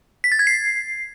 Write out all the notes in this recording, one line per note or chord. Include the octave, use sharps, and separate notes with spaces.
B6
A6
G#6
C7